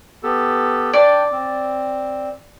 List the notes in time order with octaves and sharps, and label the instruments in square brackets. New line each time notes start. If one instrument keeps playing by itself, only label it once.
[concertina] B3 G4 A4
[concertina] D4 G5 [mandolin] D5
[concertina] C4